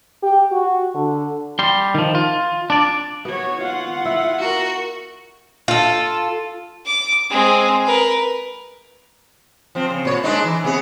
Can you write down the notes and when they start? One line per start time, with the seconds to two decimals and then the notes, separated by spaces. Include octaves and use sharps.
0.23 G4
0.51 F#4
0.95 D3
1.59 G3 C6
1.95 D#3 F3
2.15 F4
2.70 D4 D5
3.25 B3 F#4 C#5
3.62 F4 F#5
4.05 E4
4.39 F#4 A#4
5.68 F4 A4
6.86 D6
7.31 G#3 C4
7.86 A#4 B4
9.75 F3 C4
9.90 C#3
10.05 A#2 C#5
10.24 G#3 D4 D#4
10.44 E3
10.64 C3 B3 G#4